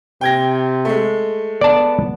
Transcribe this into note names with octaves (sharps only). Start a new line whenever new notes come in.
C3 G5 G#6 A#6
G#3 A3
B3 D5 A5